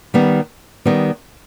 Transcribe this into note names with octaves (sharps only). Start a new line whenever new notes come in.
D#3 G3 B3
D#3 G3 B3